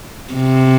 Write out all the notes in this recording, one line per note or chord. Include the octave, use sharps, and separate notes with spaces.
C3